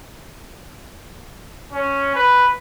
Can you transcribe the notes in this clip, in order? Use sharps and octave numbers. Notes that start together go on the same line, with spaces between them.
C#4
B4